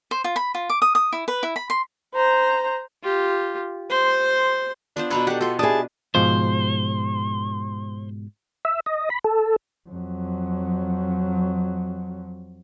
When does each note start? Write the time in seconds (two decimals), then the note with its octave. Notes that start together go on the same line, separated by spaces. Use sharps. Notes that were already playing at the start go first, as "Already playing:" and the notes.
0.11 C5
0.24 F4
0.36 B5
0.55 F4
0.70 D6
0.82 D#6
0.95 D#6
1.12 E4
1.28 B4
1.43 E4
1.56 B5
1.70 C6
2.14 C5 A#5
3.03 F4 G4
3.90 C5 C6
4.97 B3 D4 F4 C5
5.10 B2 A4 B4 A#5 C6
5.27 G4 A4 F#5
5.41 F4 F#4 A4 C6
5.59 D4 E4 G4 G#4 A5 D#6
6.15 G#2 B2 F3 C5
8.65 E5
8.86 D#5
9.10 B5
9.24 A4
9.89 F2 F#3